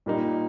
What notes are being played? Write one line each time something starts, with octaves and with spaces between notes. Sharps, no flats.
A#2 G3 A#3 D#4